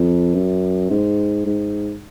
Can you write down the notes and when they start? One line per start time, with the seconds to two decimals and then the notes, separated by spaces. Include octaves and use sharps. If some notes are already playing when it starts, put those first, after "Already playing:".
Already playing: F2
0.34 F#2
0.90 G#2
1.46 G#2